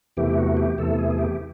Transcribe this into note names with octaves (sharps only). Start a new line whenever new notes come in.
E2 C3 E3 A3 G4
F#4
G4
E2 C3 E3 A3 A4
G#4
G#4
G4